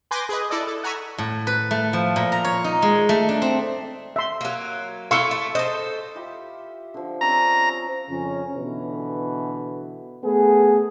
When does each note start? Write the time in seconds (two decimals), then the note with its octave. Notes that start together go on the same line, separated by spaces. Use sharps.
0.11 B4 G#5 C6 D6 G6 A#6
0.29 G#4 B4 D#5
0.50 E4 A4 D5 D#5
0.67 A4
0.83 F#5 G#5 A#5 B5 C#6 E6
1.18 A2
1.47 B4
1.71 A3
1.93 F3
2.16 A#2
2.32 A#5
2.45 C#5
2.64 D#4
2.82 G#3
3.09 A3
3.29 D4
3.42 C4
4.16 E5 C6
4.41 F#3 A#3
5.11 A3 E4 A4 F5 C6 C#6
5.31 A3
5.55 A4 C5 D#5
6.15 E4 F4 G4
6.94 D3 F3
7.21 C4 C#4 A#5
8.09 F2 C#3 C#4
8.55 B2 D3 E3 B4
10.24 A3 B3 G#4